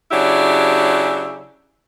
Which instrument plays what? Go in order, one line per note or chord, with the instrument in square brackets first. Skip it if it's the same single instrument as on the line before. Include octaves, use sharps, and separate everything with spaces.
[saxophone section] C#3 F#3 D4 E4 G4